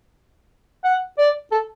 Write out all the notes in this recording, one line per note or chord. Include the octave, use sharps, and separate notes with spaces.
F#5
D5
A4